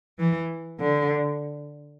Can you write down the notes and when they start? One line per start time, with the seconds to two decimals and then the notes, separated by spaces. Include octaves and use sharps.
0.19 E3
0.80 D3